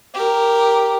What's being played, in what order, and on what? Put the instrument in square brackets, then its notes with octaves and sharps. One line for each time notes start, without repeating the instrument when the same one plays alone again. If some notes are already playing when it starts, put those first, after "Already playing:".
[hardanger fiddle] G4 A#4